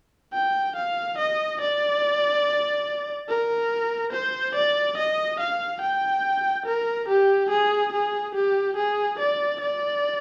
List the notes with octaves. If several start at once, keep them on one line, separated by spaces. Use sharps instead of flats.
G5
F5
D#5
D5
A#4
C5
D5
D#5
F5
G5
A#4
G4
G#4
G#4
G4
G#4
D5
D5